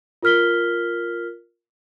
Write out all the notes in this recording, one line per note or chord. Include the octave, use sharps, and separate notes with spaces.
F4 A#4 F6 B6 G7